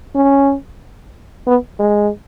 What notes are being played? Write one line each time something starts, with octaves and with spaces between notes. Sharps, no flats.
C#4
B3
G#3